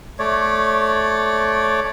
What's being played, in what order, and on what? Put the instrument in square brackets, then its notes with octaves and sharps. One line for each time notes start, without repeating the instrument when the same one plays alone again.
[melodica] A3 C#5 D5